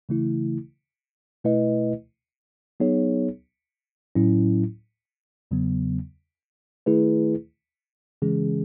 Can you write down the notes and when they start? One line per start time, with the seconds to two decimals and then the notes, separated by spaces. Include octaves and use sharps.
0.09 C#3 E3 A3 E4
1.44 B2 A3 E4 B4 D#5
2.80 F#3 B3 D#4 G#4 C#5
4.15 A2 F#3 C#4 E4
5.51 E2 C#3 F#3 B3
6.86 D#3 A3 E4 G#4 B4
8.22 C#3 E3 G#3 C#4 G#4